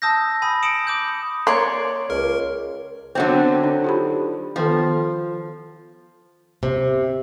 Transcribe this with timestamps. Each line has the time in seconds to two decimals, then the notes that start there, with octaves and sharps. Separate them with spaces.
0.02 A5 D#6 E6 G6 A#6
0.42 G#5 B5 D#6
0.63 D#6 C#7 D7 E7 F#7
0.87 D6 D#6 G6
1.47 A#3 C#5 D5 C6
2.10 C#2 A#4
3.15 D3 F#3 B3 C4
3.64 D#4
3.84 F4 G4 B5
4.56 D#3 F3 B3 A4
6.63 C3